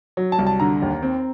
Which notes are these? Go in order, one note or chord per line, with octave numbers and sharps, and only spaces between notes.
F#3
A5
C2
A5
D3 A#5
D#2
C4